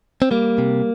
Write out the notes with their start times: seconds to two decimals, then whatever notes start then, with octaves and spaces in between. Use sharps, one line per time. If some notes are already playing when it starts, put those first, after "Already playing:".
0.22 C4
0.31 G3 A#3
0.58 C3